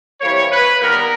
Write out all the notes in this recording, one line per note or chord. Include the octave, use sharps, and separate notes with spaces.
C3 E3 G3 A#3 C#5
B4
D#3 G3 B3 A#4